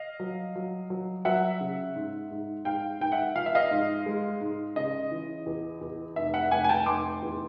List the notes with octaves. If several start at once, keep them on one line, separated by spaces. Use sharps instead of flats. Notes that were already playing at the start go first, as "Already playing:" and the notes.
Already playing: D#5 F5
F#3
F#3
F#3
F#3 E5 F#5
C#3
G#2
G#2
G#2 F5 G5
G#2 G5
E5 F#5
F3 F5
E5
D#5 F5
G#2
G#3
G#2
C#3 D#5
E3
E2
E2
F1 E5
E5 F#5
F1 F#5 G#5
G#5
G5 A5
F1 C6 D6
E2